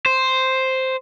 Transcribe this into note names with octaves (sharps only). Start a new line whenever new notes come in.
C5